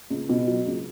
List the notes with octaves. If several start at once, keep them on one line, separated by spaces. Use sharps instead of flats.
C#2
B2
F#3
C#2